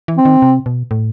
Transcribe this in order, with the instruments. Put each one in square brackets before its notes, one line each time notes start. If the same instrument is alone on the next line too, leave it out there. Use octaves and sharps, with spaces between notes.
[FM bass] E3
[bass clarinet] C4
[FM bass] D#3
C3
B2
A2